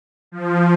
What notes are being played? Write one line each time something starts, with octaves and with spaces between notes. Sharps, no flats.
F3